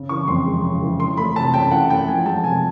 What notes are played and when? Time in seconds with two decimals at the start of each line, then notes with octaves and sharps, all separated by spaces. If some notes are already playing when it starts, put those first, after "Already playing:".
Already playing: C#3
0.09 E3 C#6
0.28 F2 C6
0.46 G#3
0.64 C#3
0.82 E3
1.00 E3 C6
1.17 A3 B5
1.36 C3 A5
1.54 C#4 G5
1.71 E3 F#5
1.89 A3 G5
2.08 F3 G#5
2.25 G#3 A5
2.43 C3 G#5